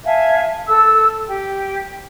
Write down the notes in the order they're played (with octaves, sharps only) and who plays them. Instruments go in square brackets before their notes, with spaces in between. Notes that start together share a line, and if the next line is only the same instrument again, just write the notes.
[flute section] E5 F5 G#5 A5
A4 E6
G4